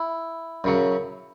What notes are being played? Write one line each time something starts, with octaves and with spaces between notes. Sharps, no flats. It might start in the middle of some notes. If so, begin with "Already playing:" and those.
Already playing: E4
F#2 C#3 F#3